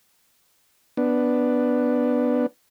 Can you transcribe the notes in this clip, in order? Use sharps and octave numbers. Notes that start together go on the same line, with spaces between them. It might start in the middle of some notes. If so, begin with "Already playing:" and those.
B3 D4